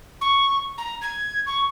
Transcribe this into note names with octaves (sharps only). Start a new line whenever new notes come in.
C#6
A#5
G#6
C#6